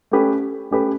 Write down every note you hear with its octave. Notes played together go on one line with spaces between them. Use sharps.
A3 C#4 G4 B4
A3 C#4 G4 B4